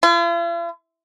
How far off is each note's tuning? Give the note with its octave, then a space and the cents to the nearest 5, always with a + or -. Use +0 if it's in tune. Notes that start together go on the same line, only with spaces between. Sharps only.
F4 -45